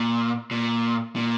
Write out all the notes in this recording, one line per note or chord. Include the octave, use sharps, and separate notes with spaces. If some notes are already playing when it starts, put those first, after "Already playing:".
Already playing: A#2
A#2
A#2